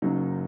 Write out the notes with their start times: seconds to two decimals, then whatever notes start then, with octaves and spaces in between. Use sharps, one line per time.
0.02 F#1 F#2 F#3 D#4